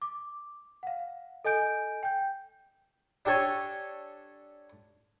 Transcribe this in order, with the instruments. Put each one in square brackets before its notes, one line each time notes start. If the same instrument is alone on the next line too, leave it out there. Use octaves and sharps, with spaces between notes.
[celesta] D6
F5 F#5
A4 D#5 G#5 G6 D7
G5 G6
[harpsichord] D4 G4 A4 C#5 G#5